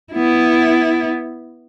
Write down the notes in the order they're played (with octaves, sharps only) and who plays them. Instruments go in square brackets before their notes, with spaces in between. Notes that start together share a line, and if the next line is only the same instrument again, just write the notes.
[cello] B3 E4